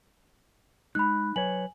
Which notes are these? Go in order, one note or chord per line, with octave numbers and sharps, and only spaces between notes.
G#3 D#4 B5 F#6
F#3 B4 C#5 G#5 F#7